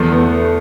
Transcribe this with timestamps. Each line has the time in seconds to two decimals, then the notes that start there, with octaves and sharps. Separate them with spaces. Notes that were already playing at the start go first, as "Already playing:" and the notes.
Already playing: E2 A3
0.12 B3